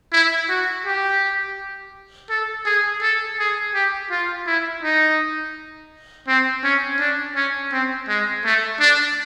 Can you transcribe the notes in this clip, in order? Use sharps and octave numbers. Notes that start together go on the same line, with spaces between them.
E4
F#4
G4
A4
G#4
A4
G#4
G4
F4
E4
D#4
C4
C#4
D4
C#4
C4
G#3
A3
D4